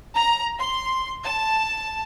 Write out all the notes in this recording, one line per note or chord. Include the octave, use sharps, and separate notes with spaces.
A#5
C6
A5